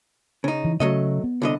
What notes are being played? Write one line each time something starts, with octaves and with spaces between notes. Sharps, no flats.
C#3 D#4
E3
C#3 F#3 A3 D#5
B3
C2 D3 D#5